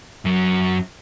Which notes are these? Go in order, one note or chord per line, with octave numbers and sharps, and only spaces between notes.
F#2 F#3